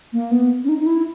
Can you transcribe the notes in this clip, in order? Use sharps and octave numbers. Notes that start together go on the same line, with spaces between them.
A#3
B3
C#4
D#4
D#4
E4